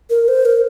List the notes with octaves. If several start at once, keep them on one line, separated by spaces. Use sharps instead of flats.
A#4
C5
A#4